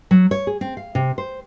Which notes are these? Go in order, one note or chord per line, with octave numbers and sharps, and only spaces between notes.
F#3
C#5
G#4
C4
F5
C3
C5